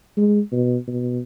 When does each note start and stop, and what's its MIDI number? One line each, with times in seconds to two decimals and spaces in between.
0.17 0.40 56
0.52 0.77 47
0.87 1.20 47